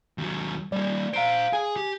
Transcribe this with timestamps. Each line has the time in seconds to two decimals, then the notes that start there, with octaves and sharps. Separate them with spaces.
0.18 D#2 F#3
0.72 G3 A#3 D5
1.14 C5 F5 A#5 D7
1.53 G#4 G#5
1.76 G4